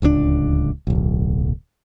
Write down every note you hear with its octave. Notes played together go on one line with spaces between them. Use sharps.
D1 C#2 D3 D4
D1 B1